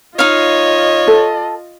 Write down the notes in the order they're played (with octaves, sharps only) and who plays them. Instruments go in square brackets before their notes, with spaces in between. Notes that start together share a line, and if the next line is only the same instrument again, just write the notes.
[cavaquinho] D#4 F5 [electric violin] F4 D#5 [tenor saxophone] C#5
[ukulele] A4